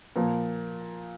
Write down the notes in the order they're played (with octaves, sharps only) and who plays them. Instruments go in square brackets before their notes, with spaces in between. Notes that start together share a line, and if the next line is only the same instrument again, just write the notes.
[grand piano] A#2 F3 A#3